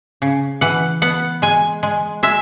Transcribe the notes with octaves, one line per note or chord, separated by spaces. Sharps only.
C#3
E3 F#5
B3 F#5
G#3 G#5
G#3
G#3 E5